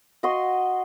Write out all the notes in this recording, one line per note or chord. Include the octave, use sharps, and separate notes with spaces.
F#4 D#5 C6